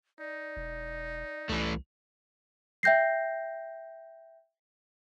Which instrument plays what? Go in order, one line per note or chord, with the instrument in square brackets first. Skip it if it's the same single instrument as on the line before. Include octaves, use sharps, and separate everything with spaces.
[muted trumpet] D#4 [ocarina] D5
[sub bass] E1
[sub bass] C2 [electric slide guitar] E3 A3
[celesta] E5 G5 G6 A#6 C7